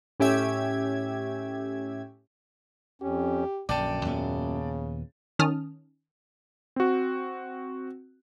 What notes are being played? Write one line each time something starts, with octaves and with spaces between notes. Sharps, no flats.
A2 C#4 G4 E5 G#6
F2 C#4 G4
A#1 F#2 D3 D5 G5 A5
D#2 A#2 C#3 B3
D#3 C#4 A5 D#6 F6
C4 F#4